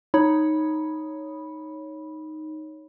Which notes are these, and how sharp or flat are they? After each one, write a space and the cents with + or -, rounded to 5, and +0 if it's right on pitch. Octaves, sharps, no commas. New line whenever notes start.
D#4 +0 C#5 +0 B5 -10